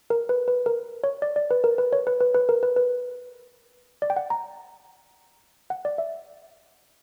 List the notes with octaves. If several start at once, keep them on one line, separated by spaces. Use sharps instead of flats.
A#4
B4
B4
A#4
C#5
D5
D5
B4
A#4
B4
C#5
B4
B4
B4
A#4
B4
B4
D5
G5
F#5
A#5
F#5
D5
E5